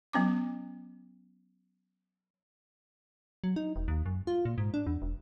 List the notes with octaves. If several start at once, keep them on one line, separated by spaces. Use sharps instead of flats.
F#3 B3 C#4 D6
F#3
D#4
E1
D#2
F#2
F4
A#2
G#2
D4
E2
E1